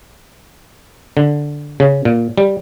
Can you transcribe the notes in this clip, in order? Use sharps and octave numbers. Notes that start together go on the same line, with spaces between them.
D3
C#3
A#2
G3